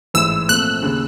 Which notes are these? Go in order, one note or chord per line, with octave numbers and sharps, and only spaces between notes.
A1 G#2 E3 E6
A#2 F3 A3 C4 F#6
D#2 C#3